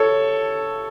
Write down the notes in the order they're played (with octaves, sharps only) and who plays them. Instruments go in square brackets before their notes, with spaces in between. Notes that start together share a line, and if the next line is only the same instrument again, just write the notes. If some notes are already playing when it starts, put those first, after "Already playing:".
Already playing: [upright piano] A4 C#5